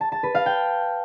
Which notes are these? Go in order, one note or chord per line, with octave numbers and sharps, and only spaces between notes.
A5
A5
B4
F5
G5